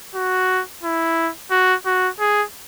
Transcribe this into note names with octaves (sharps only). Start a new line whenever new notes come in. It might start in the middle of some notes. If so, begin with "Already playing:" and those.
F#4
E4
F#4
F#4
G#4